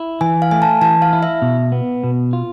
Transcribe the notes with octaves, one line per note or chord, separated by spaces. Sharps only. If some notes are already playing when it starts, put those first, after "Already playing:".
Already playing: E4
E3 G#5
F5
A3 G#5
A5
E3 A5
F5
E4
E5
B2
B3
B2
F4